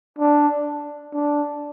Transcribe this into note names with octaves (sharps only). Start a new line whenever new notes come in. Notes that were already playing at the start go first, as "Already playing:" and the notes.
D4
D4